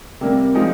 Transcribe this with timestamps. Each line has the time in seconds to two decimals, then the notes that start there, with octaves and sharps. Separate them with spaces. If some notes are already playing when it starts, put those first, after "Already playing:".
0.21 C3 G3 A#3
0.55 F3 G#3 D#4